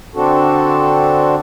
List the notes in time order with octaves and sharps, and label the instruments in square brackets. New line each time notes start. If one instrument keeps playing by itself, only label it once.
[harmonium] D3 C4 D4 F#4 A4